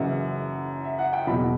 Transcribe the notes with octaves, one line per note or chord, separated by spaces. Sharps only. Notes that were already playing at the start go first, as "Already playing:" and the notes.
Already playing: F#1 F#2 C#3 E3 F#5
E5
F#5
G5
F#1 E2 B2 B5